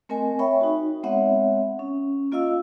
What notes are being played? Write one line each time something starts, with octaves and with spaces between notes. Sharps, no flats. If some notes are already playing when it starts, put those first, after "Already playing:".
A3 C4 A#4 D#5 G#5
C#5 E5 G5 B5 C#6
D#4 F#4
G#3 B3 C4 C#5 E5 F#5
C#4
A#3 F4 D#5 F5 E6